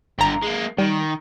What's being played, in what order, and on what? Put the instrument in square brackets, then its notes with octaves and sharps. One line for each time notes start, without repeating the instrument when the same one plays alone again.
[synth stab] G#1 A#5 [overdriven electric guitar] G2 D3
[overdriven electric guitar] G#3 A#3
[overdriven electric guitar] D#3 [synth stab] G3